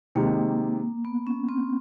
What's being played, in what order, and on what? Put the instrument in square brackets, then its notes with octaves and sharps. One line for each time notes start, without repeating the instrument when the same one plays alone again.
[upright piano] C3 D#3 G#3 [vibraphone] A#3
[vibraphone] B3
C#4
C4